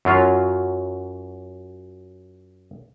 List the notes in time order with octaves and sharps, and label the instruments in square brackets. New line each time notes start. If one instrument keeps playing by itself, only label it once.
[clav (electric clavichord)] F#2 F#3 F4 F5